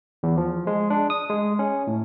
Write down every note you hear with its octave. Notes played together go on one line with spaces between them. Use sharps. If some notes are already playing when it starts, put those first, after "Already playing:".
E2
F3
G#3
D4
D#6
G#3
C#4
A2